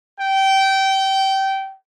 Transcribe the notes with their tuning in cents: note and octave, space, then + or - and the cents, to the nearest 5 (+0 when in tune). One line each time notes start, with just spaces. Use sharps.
G5 -20